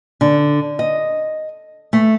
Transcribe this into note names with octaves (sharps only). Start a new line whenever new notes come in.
D3
D#5
A3